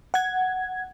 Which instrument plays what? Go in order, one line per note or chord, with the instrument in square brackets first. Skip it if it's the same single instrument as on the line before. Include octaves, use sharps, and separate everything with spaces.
[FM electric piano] F#5 G#6